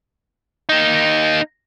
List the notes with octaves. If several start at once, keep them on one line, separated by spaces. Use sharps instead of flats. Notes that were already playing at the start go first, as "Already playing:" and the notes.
A#3 D#4